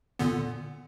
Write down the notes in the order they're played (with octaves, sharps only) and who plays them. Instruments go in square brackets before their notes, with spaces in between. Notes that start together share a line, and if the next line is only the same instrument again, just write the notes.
[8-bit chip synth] A#2 D3 B3